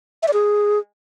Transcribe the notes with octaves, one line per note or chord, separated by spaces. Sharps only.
E5
D5
G#4